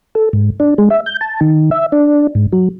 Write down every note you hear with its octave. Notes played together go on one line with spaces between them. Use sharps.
A4
G#2
D4
G#3
E5
G6
A5
D#3
E5
D4
G#2
F#3